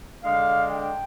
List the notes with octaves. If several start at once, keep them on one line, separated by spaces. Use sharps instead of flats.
D3 G#3 D4 F5
G5